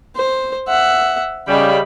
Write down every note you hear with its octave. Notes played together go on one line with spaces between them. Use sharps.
C5
E5 F#5
C#3 G3 D#5 B5